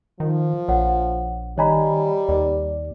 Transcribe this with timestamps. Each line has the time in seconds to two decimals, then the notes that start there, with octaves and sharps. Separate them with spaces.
0.20 D#3 F3
0.68 A#1 C#5 F#5
1.58 D#3 G3 C#5 D#5 G#5 A#5 B5
2.29 D#2 D5